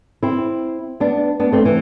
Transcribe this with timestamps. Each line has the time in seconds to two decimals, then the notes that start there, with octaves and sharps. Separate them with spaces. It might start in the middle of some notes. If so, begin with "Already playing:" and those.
0.23 C4 E4
1.00 B3 D4
1.40 B3 D4
1.52 A3 C4
1.65 E3